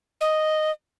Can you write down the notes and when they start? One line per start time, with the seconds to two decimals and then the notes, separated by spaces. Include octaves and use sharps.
0.21 D#5